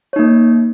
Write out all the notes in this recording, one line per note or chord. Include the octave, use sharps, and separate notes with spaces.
A#3 D#4 C#5